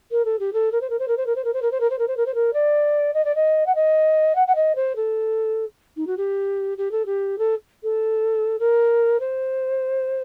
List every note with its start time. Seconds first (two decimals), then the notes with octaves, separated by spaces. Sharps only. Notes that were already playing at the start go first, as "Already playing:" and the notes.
0.11 A#4
0.25 A4
0.39 G4
0.53 A4
0.72 A#4
0.81 C5
0.90 A#4
0.99 C5
1.08 A#4
1.17 C5
1.26 A#4
1.35 C5
1.44 A#4
1.53 C5
1.62 A#4
1.71 C5
1.80 A#4
1.90 C5
1.98 A#4
2.07 C5
2.17 A#4
2.26 C5
2.34 A#4
2.53 D5
3.13 D#5
3.25 D5
3.35 D#5
3.66 F#5
3.75 D#5
4.35 F#5
4.47 F#5
4.55 D#5
4.75 C5
4.96 A4
5.96 D#4
6.06 F#4
6.17 G4
6.77 G4
6.91 A4
7.05 G4
7.38 A4
7.83 A4
8.59 A#4
9.20 C5